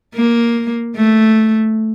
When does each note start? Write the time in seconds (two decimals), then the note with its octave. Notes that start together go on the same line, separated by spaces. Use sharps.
0.15 A#3
0.96 A3